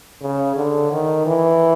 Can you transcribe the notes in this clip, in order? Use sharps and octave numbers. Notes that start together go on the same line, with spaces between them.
C#3
D3
D#3
E3